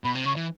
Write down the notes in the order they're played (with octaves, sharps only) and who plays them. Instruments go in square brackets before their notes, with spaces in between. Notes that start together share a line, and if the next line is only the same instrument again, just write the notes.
[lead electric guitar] B2 [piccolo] B5
[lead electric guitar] C3
[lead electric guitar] C#3 [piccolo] C#6
[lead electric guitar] E3